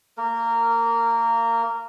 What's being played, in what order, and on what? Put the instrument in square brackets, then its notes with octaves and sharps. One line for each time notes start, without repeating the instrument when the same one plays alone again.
[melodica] A#3 A#4